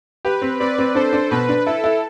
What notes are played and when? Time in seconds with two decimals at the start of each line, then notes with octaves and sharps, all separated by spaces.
0.25 G4 B4
0.42 C4
0.60 C4 B4 D5
0.78 C4
0.95 D4 A4 C5
1.13 D4
1.31 B2 B4
1.49 D4
1.66 E4 A4
1.84 E4